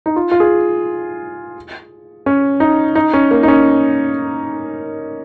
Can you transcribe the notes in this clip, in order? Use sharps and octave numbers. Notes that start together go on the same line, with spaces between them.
D#4
F4
F4
G#4
C#4
D#4
D#4
C#4
A#3
D#4
C#4